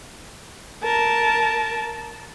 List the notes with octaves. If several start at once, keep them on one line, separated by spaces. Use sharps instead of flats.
A#4 A5